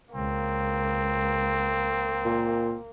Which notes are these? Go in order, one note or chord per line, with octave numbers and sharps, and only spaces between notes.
C#2 A#3 C4
A#2